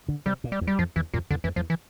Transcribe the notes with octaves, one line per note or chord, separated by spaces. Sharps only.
D3
C3 G3
A#2
G3
E2
G3
F2 F3
E2 E3
F2 A#2
E2 D3
F2 E3
E2 F3
E3